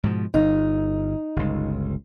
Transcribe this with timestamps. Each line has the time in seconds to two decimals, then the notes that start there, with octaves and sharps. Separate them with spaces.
0.04 G#2 B2 F3
0.34 G1 D#4
1.36 G1 C#2